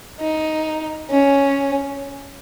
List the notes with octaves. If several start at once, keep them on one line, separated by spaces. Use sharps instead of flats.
D#4
C#4